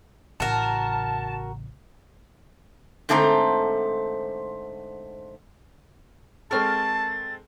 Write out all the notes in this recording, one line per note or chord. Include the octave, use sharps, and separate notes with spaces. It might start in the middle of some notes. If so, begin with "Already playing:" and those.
A1 C#3 F#4 A#4 A5
G#2 D3 A3 C4 C5 A#5
G#3 C4 A4 A#4 A5 C#6 F6 A6